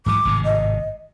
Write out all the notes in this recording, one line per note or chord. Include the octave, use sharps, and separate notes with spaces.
G#2 E3 F#3 D6
G#1 A2 C3
D#5